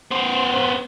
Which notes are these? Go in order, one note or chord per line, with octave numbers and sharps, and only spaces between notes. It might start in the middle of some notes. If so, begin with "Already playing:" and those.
B3 C5